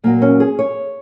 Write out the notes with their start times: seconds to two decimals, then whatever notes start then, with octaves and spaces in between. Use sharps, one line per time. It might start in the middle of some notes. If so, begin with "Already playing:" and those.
0.04 A#2 F#3 A#3
0.22 C#4
0.40 G#4
0.59 C#5